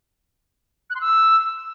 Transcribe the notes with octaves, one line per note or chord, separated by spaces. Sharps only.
F#6
C6
E6